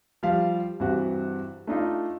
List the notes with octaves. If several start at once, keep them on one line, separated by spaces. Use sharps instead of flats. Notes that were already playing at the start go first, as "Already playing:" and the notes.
F3 G3 F5
G2 C3 E3 C4 F#4
A3 D4 D#4 F4